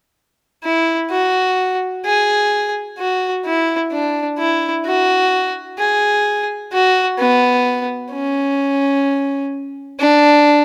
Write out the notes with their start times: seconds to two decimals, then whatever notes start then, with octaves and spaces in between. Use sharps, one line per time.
0.64 E4
1.11 F#4
2.05 G#4
2.98 F#4
3.45 E4
3.92 D4
4.38 E4
4.85 F#4
5.79 G#4
6.72 F#4
7.19 B3
8.12 C#4
9.99 D4